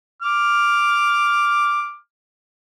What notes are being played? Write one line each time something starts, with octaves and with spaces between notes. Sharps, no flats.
D6 F6